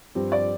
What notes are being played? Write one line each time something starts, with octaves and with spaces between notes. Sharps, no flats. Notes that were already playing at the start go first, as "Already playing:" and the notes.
G2 F3 C4 G4
D5